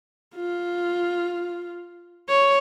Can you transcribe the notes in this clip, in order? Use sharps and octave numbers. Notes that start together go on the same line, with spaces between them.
F4
C#5